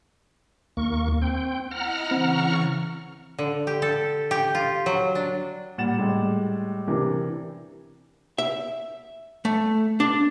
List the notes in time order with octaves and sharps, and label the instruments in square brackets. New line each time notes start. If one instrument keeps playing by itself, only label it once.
[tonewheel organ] D#2 A#3 C#6
C4 G5
[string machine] E4 D#5 B5 [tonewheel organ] F#5 A#5 F6
[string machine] C#3 E3 C#6 [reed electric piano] C4
[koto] D3
G4
A4
G4
F4
F#3
D4
[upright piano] A#2 G3 F#5 A6 E7
A2 G3 G#3
C3 E3 D4 G4 A#4
[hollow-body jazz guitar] E5
A3
D4